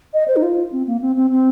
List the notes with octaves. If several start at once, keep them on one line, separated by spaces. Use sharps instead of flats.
D#5
C5
D#4
F4
C4
A#3
C4
C4
C4